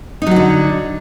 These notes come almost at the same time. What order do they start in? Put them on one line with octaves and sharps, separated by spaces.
D#4 F#3 F#4 D3